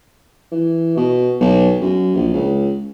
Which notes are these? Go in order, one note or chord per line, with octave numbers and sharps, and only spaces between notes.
E3
B2
B1
F#2
A#1
C#2